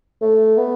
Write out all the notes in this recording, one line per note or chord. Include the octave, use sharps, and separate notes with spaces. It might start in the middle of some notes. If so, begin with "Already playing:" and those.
A3
B3